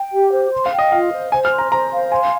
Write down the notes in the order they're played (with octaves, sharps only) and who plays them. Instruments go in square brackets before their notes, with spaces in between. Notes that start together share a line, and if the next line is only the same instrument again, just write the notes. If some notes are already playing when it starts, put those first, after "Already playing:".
Already playing: [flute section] G5
G4
C5
C6
[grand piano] F5
[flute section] G5
[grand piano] D#5
[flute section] F4 [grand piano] F5
[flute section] C5
[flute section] C5 [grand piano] G#5
[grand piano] F6
[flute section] C6
[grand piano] A#5
[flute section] C5 [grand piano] A#5
[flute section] F5
[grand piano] G#5 [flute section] C6